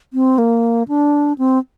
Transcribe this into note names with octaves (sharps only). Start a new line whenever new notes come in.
C4
A#3
D4
C4